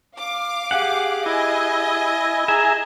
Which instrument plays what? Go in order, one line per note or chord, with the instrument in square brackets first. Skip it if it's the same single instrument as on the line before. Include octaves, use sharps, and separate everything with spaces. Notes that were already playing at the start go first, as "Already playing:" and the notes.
[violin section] F5 D6
[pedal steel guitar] G4 G#4 F#5
[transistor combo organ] E4 G#5 [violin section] D#5
[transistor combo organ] G#4 G#5 A#5 [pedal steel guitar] E5